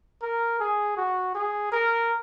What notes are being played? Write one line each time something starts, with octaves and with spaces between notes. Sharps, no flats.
A#4
G#4
F#4
G#4
A#4